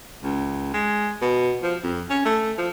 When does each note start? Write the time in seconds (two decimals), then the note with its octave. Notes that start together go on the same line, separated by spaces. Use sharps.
0.23 C#2
0.74 G#3
1.22 B2
1.63 F3
1.83 F2
2.10 C#4
2.25 A3
2.58 F3